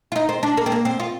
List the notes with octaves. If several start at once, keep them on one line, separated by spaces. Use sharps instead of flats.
F4
D#4
C4
D4
A#3
C4
A#3
C4
F4